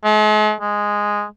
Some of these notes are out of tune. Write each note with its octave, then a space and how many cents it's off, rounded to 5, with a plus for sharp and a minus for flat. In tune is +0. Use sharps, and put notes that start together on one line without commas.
G#3 +45
G#3 -5